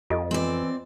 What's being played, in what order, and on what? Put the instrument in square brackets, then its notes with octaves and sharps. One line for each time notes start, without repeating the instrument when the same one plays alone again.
[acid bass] F2 [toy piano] F4 A4 D#5
[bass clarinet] E3 [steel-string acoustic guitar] C4 D5